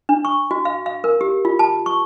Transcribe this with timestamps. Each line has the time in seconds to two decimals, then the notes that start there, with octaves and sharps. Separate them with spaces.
0.09 D4
0.25 C#6
0.51 F#4
0.65 F5
0.86 F5
1.04 A#4
1.21 G4
1.45 F4
1.59 A5
1.86 C#6